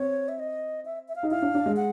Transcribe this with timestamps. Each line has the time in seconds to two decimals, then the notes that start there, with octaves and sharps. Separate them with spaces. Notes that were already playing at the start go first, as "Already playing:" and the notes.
Already playing: C4 C#5
0.28 E5
0.39 D#5
0.85 E5
1.08 E5
1.16 F5
1.23 D#4
1.31 E4 F5
1.42 D4
1.55 D4
1.66 G#3
1.77 F#5